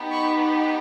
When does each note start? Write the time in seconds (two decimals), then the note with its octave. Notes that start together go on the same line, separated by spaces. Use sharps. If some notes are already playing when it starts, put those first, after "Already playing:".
Already playing: B3 D#4 G4
0.11 B5 C#6